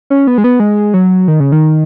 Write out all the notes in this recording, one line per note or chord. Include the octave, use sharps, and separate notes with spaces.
C#4
B3
G#3
B3
G#3
F#3
D#3
C#3
D#3